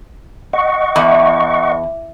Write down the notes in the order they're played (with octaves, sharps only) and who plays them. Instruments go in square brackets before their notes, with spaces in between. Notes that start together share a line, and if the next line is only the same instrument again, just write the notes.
[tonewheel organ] D#5 F#5 C#6
[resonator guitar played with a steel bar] E2